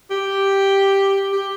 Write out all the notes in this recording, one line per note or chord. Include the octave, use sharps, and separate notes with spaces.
G4
G4